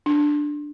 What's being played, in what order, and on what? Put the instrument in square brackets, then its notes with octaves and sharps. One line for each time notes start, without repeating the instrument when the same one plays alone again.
[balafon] D4